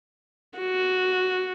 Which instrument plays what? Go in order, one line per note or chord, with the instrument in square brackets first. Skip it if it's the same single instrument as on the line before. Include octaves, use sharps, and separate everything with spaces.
[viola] F#4